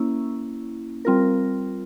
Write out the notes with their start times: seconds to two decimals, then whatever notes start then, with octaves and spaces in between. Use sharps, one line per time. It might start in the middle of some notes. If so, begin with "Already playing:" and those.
Already playing: A#3 C#4 E4
1.05 G3 C4 F4 A#4